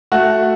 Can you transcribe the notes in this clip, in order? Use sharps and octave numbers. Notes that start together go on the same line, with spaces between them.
A3 F#4 F#5